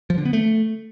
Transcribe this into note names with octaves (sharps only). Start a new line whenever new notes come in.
F3
D3
B3
A3